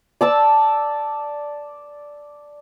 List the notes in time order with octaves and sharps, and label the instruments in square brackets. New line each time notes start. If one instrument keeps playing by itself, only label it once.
[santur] D5 A5 E6